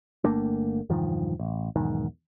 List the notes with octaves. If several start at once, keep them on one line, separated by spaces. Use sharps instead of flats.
G1 A3 A#3 D4
E1 G2 D#3 F3
A1
B1 E2 G#2 D#3